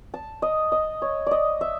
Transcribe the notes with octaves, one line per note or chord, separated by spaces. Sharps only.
A5
D#5
D#5
C#5
D5 D#5
E5